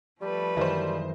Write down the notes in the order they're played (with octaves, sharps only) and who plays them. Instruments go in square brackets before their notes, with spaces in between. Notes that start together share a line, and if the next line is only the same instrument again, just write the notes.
[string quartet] F3 A3 B4 [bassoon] G3
[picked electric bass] F#2 D#3 E3 [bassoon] G3 [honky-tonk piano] C5 D#5